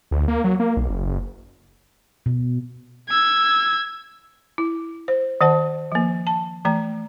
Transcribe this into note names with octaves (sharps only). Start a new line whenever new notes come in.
D2
A#3
F#3
A#3
B1
F#1
F#1
B2
E6 G#6
E4
C5
D#3 C5 F#5 A5
F3 A#3
A5
E3 A3 A#5